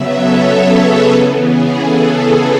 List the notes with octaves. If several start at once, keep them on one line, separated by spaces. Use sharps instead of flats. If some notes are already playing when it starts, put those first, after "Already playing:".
Already playing: C#3 F#3 B3 E5
A4 C#5
G#4 B4
C#3 E3 B3 A4
G#4
A4